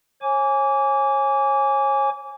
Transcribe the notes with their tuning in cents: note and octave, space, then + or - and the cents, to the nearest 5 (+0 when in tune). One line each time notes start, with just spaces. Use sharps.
C#5 -35 G#5 +0 D6 -30